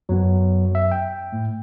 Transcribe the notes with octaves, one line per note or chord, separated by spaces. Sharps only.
F#2 F#3 B3
E5
G5
A2